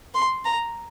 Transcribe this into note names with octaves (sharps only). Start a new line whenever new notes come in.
C6
A#5